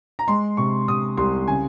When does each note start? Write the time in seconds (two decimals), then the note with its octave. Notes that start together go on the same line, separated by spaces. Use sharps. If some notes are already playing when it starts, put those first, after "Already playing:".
0.19 A#5
0.28 G#3 C6
0.57 C3 C#6
0.88 C3 D#6
1.17 C2 C6
1.47 C#3 G#5